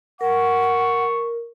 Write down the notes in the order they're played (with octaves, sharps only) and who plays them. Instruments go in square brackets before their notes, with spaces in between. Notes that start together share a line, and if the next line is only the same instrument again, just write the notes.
[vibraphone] A#4 [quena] F#5 [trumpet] C#6